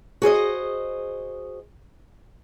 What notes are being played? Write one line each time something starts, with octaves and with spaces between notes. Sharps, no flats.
F#4 G#4 C5 D#5